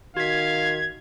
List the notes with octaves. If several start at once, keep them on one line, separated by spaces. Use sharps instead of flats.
D#3 F#4 F5 G#6 B6